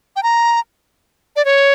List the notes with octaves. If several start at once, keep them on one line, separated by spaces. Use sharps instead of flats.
G5
A#5
D5
C#5